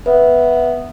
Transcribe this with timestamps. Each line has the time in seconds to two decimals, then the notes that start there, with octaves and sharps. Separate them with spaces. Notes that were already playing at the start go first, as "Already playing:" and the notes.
0.06 B3 B4 E5